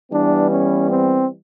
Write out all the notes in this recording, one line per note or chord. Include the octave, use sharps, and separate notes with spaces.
E3 G3 B3 D4
C#4
C4